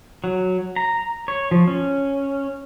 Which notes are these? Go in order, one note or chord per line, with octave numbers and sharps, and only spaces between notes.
F#3
A#5
C#5
F3
C#4